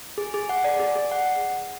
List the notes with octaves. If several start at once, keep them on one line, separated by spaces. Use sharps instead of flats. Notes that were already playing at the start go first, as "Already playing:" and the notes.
G#4
G#4
F#5
D5
G#4
G#4
F#5